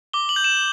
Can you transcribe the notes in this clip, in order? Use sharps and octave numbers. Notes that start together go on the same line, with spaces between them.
D6 G7
F#7
G6
E7